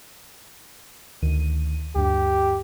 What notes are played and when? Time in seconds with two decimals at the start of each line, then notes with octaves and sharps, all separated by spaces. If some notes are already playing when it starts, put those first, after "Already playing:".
1.22 D2 D#3 D#7
1.95 D2 G2 G4